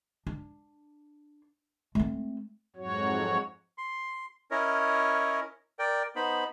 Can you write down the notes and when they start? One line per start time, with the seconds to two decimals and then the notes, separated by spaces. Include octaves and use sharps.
0.27 D4
1.95 A3 C4
2.76 F2 G#2 F#3 F#4 C#5
3.78 C6
4.51 C#4 E4 A#4 C#5 D#5
5.79 A#4 D5 G5
6.16 B3 D#4 C5 B5